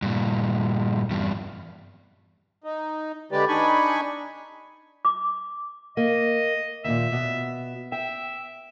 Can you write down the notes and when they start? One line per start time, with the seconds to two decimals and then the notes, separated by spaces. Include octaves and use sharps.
0.02 G2 A#2
1.10 E2 G2
2.64 D#4
3.32 D3 G#3 G4 B4 D5
3.48 D4 D#4 G#5 B5 C#6
5.05 D6
5.97 A#3 D#5
6.85 D#2 A#2 E5
7.12 B2
7.92 E5 G5